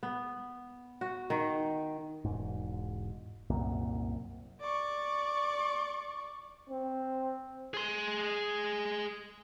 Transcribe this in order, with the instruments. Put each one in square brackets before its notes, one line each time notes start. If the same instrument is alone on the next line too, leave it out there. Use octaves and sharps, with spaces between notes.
[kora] B3
F#4
D#3
[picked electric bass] E1 G#2
C2 F#2 A#2
[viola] D5 C#6
[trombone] C4
[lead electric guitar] G#4 C6